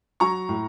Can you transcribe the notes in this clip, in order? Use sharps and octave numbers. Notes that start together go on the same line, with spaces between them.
F#3 A#5 C#6
A2